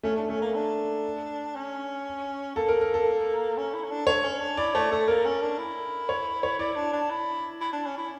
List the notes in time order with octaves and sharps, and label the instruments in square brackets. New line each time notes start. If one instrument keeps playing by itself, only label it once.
[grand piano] A3 [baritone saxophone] C#4
[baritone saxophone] D4
[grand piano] A3 [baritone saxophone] C#4
[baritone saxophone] A#3
D4
C#4
[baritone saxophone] A#3 [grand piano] A4
[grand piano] A#4
A#4
A4
[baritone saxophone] C#4
E4
C#4
D4
[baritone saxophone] D4 [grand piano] C#5
[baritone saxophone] C#4
D4
[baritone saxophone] E4 [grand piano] D5
[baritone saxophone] A3 [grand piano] C#5
[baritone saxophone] A3 [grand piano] A4
[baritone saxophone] A#3 [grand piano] A#4
[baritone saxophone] C#4
D4
E4
[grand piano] C#5
C#5
[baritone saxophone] E4 [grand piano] D5
[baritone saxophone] D4
D4
E4
E4
D4
C#4
E4